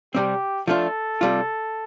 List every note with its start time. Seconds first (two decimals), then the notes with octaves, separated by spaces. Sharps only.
0.15 C3 G3 C4 G4
0.68 F3 A3 D4 F4 A4
1.21 C3 G3 F4